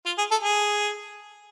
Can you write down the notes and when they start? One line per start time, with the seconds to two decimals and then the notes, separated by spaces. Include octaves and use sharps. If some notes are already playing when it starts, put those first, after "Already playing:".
0.06 F4
0.18 G#4
0.31 A4
0.43 G#4